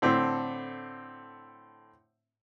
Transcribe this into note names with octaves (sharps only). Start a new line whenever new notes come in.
A2 D3 C4